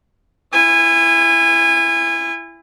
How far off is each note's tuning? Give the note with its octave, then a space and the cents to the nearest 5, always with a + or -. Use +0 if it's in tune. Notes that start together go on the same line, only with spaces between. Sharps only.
E4 +25 G#5 -25